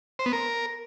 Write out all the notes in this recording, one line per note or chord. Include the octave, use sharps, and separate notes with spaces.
C5
B3
A#4